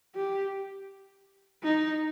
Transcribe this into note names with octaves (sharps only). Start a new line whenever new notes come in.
G4
D#4